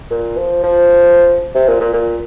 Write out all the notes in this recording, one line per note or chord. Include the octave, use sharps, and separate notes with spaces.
A#2
F3
F3
C3
A#2
A#2
A#2